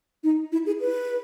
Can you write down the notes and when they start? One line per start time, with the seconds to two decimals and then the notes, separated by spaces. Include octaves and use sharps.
0.24 D#4
0.52 E4
0.66 G#4
0.81 B4